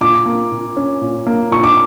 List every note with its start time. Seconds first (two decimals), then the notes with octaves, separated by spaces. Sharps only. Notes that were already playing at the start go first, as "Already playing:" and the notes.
0.01 A#2 D6
0.26 A#3
0.52 A#2
0.77 C#4
1.01 A#2
1.27 A#3
1.51 A#2 C#6
1.64 D6